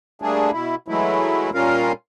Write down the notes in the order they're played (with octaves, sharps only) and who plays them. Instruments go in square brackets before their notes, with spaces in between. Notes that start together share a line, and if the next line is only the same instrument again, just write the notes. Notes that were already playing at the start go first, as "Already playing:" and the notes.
[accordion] G3 A3 A#3 D4 G#4
B2 E4
E3 F#3 G#3 A3 E4
A#2 G3 C#4 F4 A#4 F5